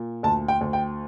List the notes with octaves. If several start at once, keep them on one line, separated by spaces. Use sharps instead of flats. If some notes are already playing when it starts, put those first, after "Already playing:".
Already playing: A#2
D2 A5
G5
D2
G5